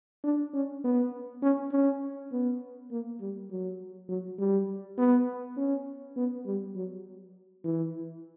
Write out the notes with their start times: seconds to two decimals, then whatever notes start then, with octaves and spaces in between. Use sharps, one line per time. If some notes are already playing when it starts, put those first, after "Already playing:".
0.24 D4
0.54 C#4
0.84 B3
1.43 C#4
1.72 C#4
2.32 B3
2.91 A#3
3.20 G3
3.51 F#3
4.09 F#3
4.39 G3
4.98 B3
5.57 C#4
6.17 B3
6.46 G3
6.76 F#3
7.64 E3